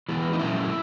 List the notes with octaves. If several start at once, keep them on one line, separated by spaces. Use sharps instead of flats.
E3 G#3 B3
D#4
A#2 F#3 C#4 E4